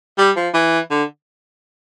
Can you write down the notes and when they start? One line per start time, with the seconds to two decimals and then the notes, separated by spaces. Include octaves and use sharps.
0.18 G3
0.36 F3
0.54 E3
0.90 D3